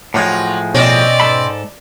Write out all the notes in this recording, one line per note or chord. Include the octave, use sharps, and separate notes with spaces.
A2 F3 F#3 G#3 F4
B2 C4 C#4 D5 D#5
G#2 A4 B5